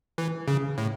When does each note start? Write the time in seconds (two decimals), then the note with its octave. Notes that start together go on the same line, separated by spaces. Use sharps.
0.18 E3
0.48 C#3
0.78 A2